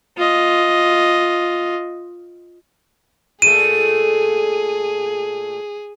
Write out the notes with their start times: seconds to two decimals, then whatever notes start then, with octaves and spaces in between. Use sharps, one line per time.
0.17 F4 D#5
3.42 A#2 A3 G#4 D#7